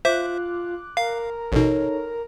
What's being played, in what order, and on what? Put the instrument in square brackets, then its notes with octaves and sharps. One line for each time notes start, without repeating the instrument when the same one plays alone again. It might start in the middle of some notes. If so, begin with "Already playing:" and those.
[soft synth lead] F4 [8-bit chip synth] C5 E5 [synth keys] D6 F#6
[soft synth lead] A#4 [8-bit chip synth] F5
[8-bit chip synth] A1 B2 [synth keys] D#4 A4 C#5